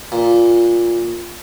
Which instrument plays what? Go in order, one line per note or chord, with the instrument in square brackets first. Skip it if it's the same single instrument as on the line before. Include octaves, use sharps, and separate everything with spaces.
[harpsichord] A#2